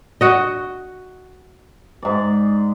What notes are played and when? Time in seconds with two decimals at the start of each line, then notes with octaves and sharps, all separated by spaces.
0.21 F#4 D#5
2.02 G#2 D5